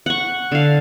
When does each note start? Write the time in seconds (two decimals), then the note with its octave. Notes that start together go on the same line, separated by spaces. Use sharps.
0.06 F#5 C#6
0.52 D3 F5